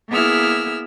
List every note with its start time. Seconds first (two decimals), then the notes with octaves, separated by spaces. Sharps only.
0.10 A#3 B3 E4 G#4 E6 F6